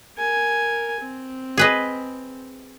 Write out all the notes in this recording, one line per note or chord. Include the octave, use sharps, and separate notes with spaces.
A#4 G#5
C4
G#4 B4 D#5